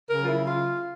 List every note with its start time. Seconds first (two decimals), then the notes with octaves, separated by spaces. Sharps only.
0.08 C#3 F#3 A#4
0.23 F4
0.27 E4
0.47 F4